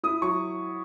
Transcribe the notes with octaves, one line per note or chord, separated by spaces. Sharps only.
E4 D#6
F#3 C#6